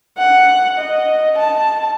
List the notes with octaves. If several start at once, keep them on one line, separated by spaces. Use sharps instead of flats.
F#5
D#5
A5